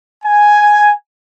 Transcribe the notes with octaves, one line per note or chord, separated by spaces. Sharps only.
G#5